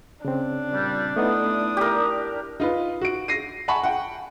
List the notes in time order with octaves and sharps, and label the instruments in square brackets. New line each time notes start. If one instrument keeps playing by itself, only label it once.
[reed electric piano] C#3 C4 [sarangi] D4
[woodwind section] A#2 G3
[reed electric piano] A3 B3 D#4 [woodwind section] E4 D#6
[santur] G4 A#4
[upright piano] D#4 F4 B4
F#4 D7
A#6 C7 D#7
F#5 G#5 A5 B5 C#6
F#5 G5